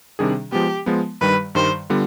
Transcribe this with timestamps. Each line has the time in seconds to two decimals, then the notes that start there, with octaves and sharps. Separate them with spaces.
0.19 C3 D#3 G3 D4 G#4
0.52 F3 G#3 B3 G4
0.86 F3 G#3 B3
1.21 G2 D#3 G3 B4
1.55 G2 D#3 G3 C5
1.90 D3 G3 B3 F4